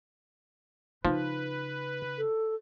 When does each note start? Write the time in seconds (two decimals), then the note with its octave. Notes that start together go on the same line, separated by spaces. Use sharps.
1.05 C#3 F3 D#4 B4
2.18 A4